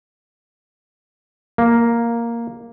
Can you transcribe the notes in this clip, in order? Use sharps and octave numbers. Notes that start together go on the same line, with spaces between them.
A#3